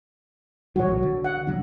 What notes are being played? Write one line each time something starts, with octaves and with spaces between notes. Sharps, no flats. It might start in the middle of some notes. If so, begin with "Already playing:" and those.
A2 E3 F#3 F#4 C#5
B1 F#3
D3
F#5
C3 F#3 D4